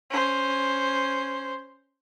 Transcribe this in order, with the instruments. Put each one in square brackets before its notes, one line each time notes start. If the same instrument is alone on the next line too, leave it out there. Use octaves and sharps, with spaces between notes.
[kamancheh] C#4 C5